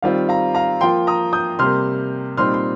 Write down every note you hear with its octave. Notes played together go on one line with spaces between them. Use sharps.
D#3 G3 C4 F4 F5
F5 A#5
F5 A#5
F3 A#3 F4 G5 C6
A#5 D#6
D#6 G6
C3 G3 A#3 C6 F6
A#2 G3 C4 D#4 C6 F6
C6